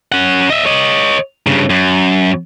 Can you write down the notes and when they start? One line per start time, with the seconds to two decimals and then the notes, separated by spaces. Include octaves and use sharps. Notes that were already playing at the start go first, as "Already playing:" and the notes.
0.12 C#4 F#5
0.50 D#5 E5
0.66 C#5 D#5
1.47 G2 C#3
1.70 F#2